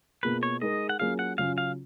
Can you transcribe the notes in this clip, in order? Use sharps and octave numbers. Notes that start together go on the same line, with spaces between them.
B2 A#3 F4 G#4 B4
C#5
G#3 D#4 A#4 D#5
F#5
F#3 A#3 C#4 F4 G#4 F5
F#5
C#3 F#3 C#4 F4 F5
F5